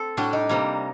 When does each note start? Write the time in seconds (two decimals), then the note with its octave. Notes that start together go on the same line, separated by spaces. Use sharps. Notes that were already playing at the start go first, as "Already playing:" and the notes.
Already playing: C4 A4
0.17 A2 G3 D4 F#4 G4
0.33 D#4
0.49 C3 G3 A#3